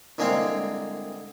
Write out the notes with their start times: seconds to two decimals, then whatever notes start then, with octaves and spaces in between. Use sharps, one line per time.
0.18 C2 D3 G#3 A#3 C4 F5